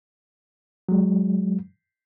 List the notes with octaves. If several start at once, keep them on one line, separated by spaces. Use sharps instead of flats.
F#3 G#3